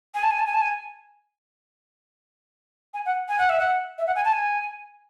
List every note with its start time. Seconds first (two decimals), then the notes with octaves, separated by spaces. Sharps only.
0.15 G#5
0.23 A5
0.31 G#5
0.39 A5
0.46 G#5
0.54 A5
0.61 G#5
2.94 G#5
3.06 F#5
3.29 G#5
3.39 F#5
3.49 E5
3.60 F#5
3.98 E5
4.07 F#5
4.16 G#5
4.25 A5
4.32 G#5